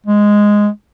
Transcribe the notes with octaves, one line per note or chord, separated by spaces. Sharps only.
G#3